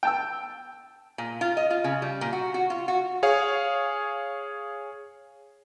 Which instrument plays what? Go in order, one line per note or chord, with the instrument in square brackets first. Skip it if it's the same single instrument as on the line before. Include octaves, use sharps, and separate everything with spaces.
[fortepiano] G5 A5 E6
[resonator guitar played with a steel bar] A#2
F4
D#5
F4
C#3
G3
A#2
F#4
F#4
F4
F#4
[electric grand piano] G#4 C#5 F5